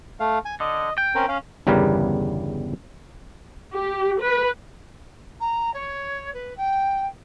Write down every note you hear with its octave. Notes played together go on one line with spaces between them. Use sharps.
A3 F5
G#5
D3 D#5
G5
C4 C#4 A#4
C#4 F5
G1 E2 C#3 G3 A#4 B4
G4
B4
A#5
C#5
B4
G5